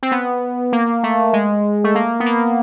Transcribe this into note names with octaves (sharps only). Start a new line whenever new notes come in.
C4
B3
A#3
A3
G#3
A3
A#3
B3
A#3